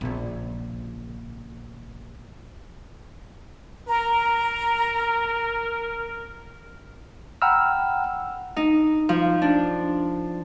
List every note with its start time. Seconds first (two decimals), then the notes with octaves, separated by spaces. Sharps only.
0.01 A#1 C#3
3.87 A#4 A#5
7.42 F#5 G5 A#5 B5 E6 F6
8.56 D#4
9.09 F3
9.42 D4